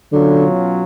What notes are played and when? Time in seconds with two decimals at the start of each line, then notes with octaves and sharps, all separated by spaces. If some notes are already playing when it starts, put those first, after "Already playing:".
0.12 B2 D3 F#3 C#4 F4